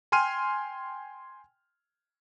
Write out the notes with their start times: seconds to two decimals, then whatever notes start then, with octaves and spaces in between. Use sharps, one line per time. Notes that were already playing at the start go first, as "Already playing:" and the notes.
0.12 G5 G#5 C6 F6 D#7